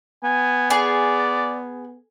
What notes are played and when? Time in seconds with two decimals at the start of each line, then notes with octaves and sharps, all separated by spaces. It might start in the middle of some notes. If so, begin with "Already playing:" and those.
0.24 B3 G#5
0.70 G#4 D5